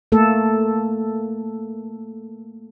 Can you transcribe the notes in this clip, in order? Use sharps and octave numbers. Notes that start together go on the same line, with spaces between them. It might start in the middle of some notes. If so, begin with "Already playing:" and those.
A3 A#3 A4